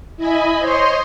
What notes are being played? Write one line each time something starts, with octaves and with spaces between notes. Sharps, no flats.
E4 D#5 G#5 B5
C5 C#5 D#5 C6